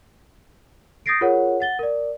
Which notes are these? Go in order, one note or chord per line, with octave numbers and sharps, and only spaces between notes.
D#6 G6 A6 A#6 C7 D7
F4 G#4 A#4 C#5 F#5
F#5 A6 G7
A#4 D5